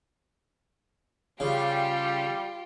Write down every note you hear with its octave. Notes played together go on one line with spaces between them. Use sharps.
C#3 G3 F4 G4